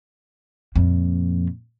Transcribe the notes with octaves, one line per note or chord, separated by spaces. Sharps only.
F2 A#2